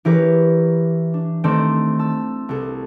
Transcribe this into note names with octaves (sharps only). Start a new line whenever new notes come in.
E3 E4 G4 A#4 B4 C#5
D4
D#3 A3 C4 A4 D5
A5 E6
C2 A4